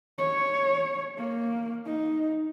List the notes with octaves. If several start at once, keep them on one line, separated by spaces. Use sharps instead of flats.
C#5
A#3
D#4